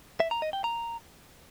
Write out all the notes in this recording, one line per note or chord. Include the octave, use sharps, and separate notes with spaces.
E5
A#5
D#5
G5
A#5